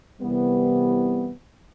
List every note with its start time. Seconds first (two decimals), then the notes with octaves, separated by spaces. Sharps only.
0.20 C2 C3 E3 G3 B3